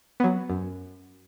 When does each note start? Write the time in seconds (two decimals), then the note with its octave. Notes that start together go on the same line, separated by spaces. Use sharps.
0.20 F#3 B3
0.50 F#2